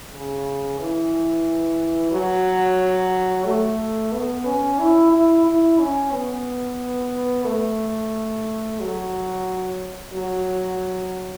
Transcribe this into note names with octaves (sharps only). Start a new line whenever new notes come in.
C#3
E3
F#3
A3
B3
C#4
E4
E4
E4
C#4
B3
A3
F#3
F#3